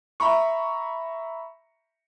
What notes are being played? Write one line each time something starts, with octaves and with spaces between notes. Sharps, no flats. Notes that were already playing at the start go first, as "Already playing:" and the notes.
E5 A#5 B5 C#6